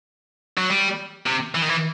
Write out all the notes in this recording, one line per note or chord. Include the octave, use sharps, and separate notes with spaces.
F#3
G3
C3
E3
D#3
E3